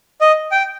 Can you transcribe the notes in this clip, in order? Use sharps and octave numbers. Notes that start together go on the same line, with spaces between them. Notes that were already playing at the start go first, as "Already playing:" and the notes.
D#5
G5